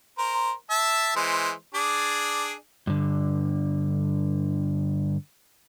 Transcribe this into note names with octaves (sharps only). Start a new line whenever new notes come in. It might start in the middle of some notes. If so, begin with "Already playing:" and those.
A#4 C5
E5 A5
E3 G#3 C5
D4 G#4 D5
G2 D3